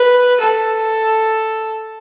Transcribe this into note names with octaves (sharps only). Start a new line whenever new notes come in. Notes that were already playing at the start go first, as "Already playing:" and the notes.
Already playing: B4
A4